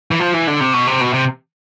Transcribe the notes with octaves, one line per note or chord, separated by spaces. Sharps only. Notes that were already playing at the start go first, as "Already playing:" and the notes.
E3
F3
E3
D3
C3
B2
C3
B2
C3